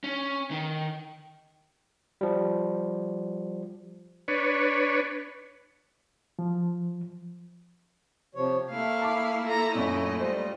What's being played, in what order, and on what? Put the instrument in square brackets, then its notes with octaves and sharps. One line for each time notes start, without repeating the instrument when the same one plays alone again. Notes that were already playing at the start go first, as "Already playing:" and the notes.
[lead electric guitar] C#4
D#3
[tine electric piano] F3 G3
[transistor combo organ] D4 B4 C#5
[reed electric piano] F3
[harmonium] C3 F3 C#5
[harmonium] A3 [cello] A#3 E4 [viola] F5
[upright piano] A5 D6
[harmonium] F4 [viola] A4 A#5
[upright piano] F#2 A#2 [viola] A3 D#5 [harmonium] C#5
[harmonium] G3 F4 [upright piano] C5